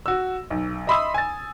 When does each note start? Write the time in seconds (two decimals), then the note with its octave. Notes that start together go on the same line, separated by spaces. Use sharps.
0.06 F#4 E6
0.50 B1
0.87 D#5 E5 B5 C6 D#6 E6
1.14 G#5 A6